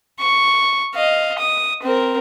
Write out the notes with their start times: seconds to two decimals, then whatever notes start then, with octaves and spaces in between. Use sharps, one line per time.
0.20 C#6
0.95 D#5 F5
1.39 D#6
1.82 C4 A#4